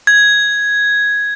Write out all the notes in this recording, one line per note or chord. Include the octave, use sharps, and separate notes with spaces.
G#6